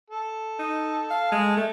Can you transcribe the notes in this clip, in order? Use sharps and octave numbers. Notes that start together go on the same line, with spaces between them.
A4
D#4
F5
G#3
A3